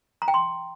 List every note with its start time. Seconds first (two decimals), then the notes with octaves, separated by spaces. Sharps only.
0.22 A#5
0.28 G5
0.34 C6